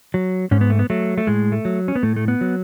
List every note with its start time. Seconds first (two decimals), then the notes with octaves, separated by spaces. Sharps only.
0.14 F#3
0.51 G#2 C#4
0.61 B3
0.70 A3
0.79 B3
0.90 F#3 A3
1.18 A3
1.27 A2 G#3
1.52 A3
1.65 F#3
1.88 C#4
1.96 B3
2.03 A2 A3
2.16 A3
2.28 B3
2.41 F#3